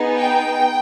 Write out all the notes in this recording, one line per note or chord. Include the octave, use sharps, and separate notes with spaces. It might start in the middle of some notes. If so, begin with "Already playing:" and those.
Already playing: B3 D#4 G#4
G5